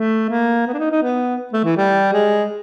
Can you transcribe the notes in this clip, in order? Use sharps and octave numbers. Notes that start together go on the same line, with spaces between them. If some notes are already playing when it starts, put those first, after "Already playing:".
Already playing: A3
A#3
B3
D4
D#4
D#4
B3
A3
E3
G3
G#3